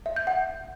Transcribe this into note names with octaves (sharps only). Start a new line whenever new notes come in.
E5
G6
F#5